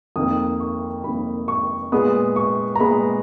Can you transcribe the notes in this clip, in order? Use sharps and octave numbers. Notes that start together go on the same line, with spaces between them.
F2 D#3 A#3 D#6
C#6
F2 D#3 A#3 B5
C#6
A#2 G#3 B3 D#6
C#6
A#5
A#2 G#3 B3 B5